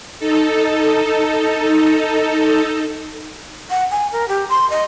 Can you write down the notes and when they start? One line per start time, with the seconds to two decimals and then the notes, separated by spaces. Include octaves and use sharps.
0.19 D#4 A4
3.70 F#5
3.91 G#5
4.12 A#4
4.29 G4
4.50 C6
4.70 D#5